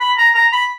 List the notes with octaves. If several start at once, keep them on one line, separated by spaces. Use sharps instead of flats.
B5
A#5
A#5
B5